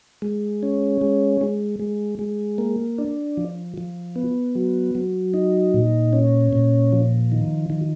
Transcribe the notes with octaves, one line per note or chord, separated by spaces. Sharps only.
G#3
C#4
G#3
G#3
G#3
G#3
A#3
D4
F3
F3
B3
F#3
F#3
D#4
A#2
C#4
A#2
F3
D#3
D#3